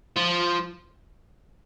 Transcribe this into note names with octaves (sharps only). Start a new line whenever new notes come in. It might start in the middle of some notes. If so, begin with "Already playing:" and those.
F3